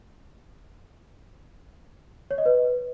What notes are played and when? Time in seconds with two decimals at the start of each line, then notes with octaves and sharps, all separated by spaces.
2.31 C#5
2.38 D#5
2.46 B4